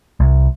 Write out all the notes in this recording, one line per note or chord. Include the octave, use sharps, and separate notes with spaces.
C2